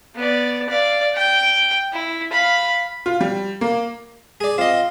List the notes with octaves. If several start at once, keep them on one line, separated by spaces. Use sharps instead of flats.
B3 D5
D5 F5
G5
E4
F5 B5
F4
G3
A#3
G#4 D5
C4 F4 D#5